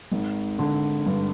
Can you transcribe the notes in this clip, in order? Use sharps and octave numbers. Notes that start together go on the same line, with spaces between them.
G#1
D3
G2